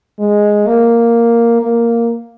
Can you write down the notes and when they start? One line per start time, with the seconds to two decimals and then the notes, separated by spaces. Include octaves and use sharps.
0.19 G#3
0.67 A#3
1.61 A#3